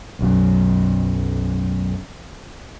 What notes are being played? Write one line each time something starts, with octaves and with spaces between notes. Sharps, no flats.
B1 F#2